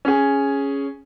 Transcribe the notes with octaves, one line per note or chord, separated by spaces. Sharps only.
C#4 G#4